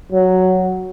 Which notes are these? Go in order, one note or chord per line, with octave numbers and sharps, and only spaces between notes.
F#3